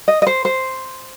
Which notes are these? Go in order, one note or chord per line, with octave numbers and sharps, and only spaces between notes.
D#5
D#5
C5
C5